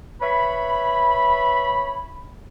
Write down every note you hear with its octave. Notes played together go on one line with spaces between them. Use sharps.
B4 C#5 E5 B5